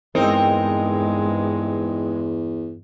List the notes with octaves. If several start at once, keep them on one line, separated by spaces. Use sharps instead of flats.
E2 G2 G#3 C4 D#4 A#4